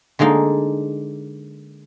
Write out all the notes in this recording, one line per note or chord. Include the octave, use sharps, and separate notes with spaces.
D3 G#3 A#3 D#4